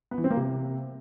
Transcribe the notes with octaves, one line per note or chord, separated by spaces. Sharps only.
B3
E3
C4
A#3
C3